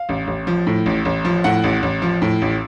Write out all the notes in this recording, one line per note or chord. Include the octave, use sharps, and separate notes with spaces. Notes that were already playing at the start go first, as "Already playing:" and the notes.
Already playing: F5
A1
A1
F3
A2
A1
A1
F3
A2 F#5
A1
A1
F3
A2
A1